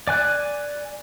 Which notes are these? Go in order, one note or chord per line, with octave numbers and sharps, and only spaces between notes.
D5 G#5 F#6